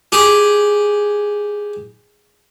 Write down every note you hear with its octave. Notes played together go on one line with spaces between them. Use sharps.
G4 G#4